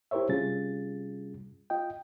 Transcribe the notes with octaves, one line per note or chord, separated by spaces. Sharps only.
E4 G4 A#4 C5 C#5 E5
C3 G3 C#4 F4 G#4 A6
F4 D#5 G5